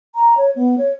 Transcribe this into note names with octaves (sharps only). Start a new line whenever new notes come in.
A#5
C#5
B3
C#5